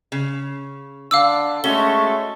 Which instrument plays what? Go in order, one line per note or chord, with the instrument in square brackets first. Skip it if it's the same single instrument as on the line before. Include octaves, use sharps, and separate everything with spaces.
[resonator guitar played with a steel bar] C#3
[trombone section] D3 D4 [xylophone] F5 D6 E6
[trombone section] G#3 A3 A4 [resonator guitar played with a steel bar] C#4 F#4 [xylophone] G7